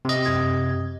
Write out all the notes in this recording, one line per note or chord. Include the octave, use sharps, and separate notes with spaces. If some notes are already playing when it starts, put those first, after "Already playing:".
C3 D#5
F#2 G4 G#6